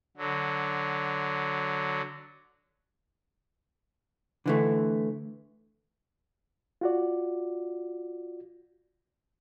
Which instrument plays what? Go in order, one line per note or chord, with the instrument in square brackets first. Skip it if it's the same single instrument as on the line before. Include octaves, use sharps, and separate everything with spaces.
[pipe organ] D3 F#3
[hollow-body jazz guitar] D3 E3 A3
[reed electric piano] F4 F#4 D5